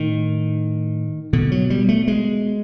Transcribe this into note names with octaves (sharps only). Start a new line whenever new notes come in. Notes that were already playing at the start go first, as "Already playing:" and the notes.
Already playing: A2 D#3
B2 D3
F#3
G3
A3
G#3